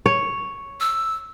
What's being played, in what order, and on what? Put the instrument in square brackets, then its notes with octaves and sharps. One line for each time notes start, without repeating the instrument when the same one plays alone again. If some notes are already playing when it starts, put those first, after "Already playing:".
[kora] C#5
[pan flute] E6